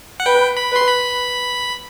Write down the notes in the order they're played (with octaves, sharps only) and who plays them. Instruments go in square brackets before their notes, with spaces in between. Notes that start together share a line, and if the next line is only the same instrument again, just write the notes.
[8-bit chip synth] F#5
[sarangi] B4 [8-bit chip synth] G5
[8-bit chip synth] B5
[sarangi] B4 [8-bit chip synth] C6
[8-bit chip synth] B5